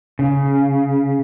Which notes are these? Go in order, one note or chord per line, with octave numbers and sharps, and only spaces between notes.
C#3